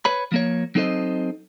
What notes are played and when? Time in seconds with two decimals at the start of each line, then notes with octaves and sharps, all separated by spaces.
0.05 B4 C#5 B5
0.32 F3 A#3 C#5
0.75 F#3 C4 D#4 A4 C5 D#5